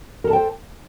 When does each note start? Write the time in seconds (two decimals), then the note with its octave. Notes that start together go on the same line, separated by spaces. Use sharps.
0.24 A#4
0.27 A4
0.30 A5
0.33 G5
0.36 C5